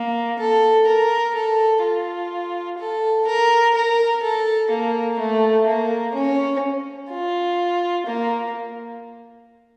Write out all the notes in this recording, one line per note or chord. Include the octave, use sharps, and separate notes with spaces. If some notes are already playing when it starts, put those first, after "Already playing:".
Already playing: A#3
A4
A#4
A4
F4
A4
A#4
A#4
A4
A#3
A3
A#3
C#4
F4
A#3